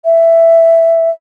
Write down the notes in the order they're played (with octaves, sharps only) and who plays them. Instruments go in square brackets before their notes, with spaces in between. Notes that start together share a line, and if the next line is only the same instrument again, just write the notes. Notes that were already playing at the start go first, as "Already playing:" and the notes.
[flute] E5